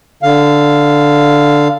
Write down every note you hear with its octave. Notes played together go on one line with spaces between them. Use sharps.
D3 F5